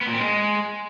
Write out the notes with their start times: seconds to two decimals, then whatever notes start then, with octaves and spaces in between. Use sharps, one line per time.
0.01 B3
0.07 A#2
0.13 C4
0.19 G#3